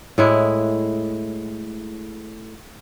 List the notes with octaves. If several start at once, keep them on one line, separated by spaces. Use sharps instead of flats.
A2 G#3 E4